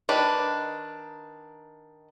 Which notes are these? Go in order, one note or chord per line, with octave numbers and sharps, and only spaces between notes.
D#3 D4 B4